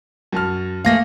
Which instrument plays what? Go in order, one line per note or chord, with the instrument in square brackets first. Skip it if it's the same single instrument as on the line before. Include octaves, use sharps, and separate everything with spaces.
[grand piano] F#2 A5 F6
[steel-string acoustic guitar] A3 A#3 G#4 [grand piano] F5 A#6